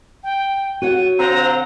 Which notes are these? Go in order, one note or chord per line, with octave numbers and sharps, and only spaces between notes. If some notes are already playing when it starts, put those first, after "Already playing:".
G5
F#4 C#5 F#5 D#7
D3 F3 C4 A#5